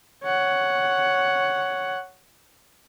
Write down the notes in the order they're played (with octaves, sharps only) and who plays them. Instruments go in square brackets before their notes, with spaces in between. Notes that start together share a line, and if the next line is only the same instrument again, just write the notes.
[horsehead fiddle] C#5 F#5